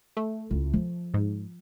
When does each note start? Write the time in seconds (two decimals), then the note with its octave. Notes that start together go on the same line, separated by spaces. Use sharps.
0.17 A3
0.51 C#2 E4
0.74 F3
1.14 G#2